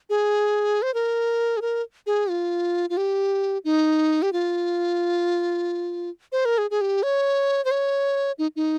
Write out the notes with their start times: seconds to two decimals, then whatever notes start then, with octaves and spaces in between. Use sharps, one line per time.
0.10 G#4
0.82 C5
0.94 A#4
1.57 G#4
1.62 A#4
2.06 G#4
2.30 F4
2.90 F4
2.97 G4
3.65 D#4
4.22 G4
4.33 F4
6.32 C5
6.45 A#4
6.58 G#4
6.71 G#4
6.81 G4
7.03 C#5
7.65 C5
7.71 C#5
8.38 D#4
8.56 D#4